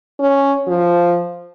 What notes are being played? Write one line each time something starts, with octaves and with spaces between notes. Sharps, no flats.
C#4
F3